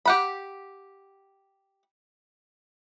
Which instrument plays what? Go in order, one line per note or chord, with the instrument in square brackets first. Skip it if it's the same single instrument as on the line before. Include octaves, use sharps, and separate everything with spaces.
[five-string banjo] G4 F#5 B5